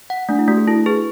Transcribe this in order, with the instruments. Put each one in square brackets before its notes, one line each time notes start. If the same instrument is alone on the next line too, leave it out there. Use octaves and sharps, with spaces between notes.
[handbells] F#5
[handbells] A3 [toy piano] D4
[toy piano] E4
[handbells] A3 [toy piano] F#4
[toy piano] G#4
[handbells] E4 [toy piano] A4
[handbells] G#4 [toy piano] B4